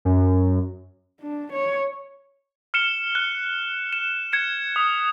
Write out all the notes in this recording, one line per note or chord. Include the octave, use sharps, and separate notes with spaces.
F#2
D4
C#5
F6 C#7 E7 G7
F#6
E7
G#6 C#7 E7
D#6